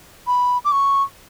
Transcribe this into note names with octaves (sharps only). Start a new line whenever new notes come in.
B5
D6
C#6